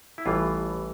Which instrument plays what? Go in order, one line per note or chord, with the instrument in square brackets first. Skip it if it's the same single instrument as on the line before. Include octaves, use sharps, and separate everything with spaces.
[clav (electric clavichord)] E4
A1 A2 E3 G3 F4